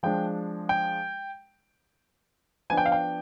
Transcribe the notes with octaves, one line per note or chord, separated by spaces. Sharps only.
F3 G#3 D4 G5
G5
F3 B3 D4 G#5
G5
F5
G5